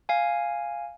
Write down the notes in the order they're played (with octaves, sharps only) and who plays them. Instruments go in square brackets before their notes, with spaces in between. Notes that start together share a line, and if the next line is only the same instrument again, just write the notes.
[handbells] F5 G#5